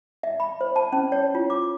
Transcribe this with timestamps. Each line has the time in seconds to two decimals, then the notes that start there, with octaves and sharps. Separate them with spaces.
0.23 E5
0.40 B5
0.61 C5
0.76 A5
0.93 C#4
1.12 C#5
1.35 F4
1.50 D6